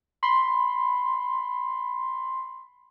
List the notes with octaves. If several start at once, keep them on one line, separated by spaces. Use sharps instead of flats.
B5 C6